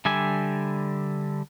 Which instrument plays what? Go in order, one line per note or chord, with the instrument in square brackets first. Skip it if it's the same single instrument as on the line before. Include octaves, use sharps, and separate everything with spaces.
[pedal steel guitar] D3 G3 E5 G#5 D6